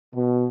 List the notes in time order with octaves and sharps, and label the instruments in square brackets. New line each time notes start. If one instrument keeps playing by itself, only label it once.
[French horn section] B2